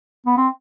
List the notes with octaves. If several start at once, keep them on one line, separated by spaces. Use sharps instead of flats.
B3
C4